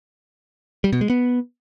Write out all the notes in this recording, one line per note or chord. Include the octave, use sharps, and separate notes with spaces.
G3
B2
G#3
B3